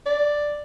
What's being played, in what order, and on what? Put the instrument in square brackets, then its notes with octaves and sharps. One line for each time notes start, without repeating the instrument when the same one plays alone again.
[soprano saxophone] D5